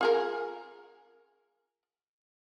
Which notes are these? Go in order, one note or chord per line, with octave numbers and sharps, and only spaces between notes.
F4 G#4 A#4